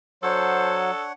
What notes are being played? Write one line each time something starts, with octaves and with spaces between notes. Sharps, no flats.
F#3 D4 A4 C5 C#5 F#5